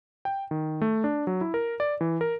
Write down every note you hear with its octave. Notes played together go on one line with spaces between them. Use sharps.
G5
D#3
A3
D4
F#3
E4
A#4
D5
E3
A#4